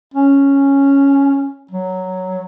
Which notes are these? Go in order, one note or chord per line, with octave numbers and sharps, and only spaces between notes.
C#4
F#3